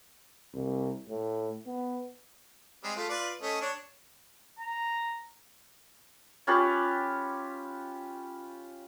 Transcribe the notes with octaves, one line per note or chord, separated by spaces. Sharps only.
C2
A2
B3
G3 G#3 C4
A3 F4
F4 B4 D5
A3 C#4 D#5
D4 C#5
A#5
C#4 F4 G4 B4